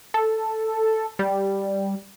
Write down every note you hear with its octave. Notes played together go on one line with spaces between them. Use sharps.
A4
G3